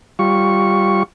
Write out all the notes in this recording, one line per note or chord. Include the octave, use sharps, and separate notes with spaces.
G3 F4 C#6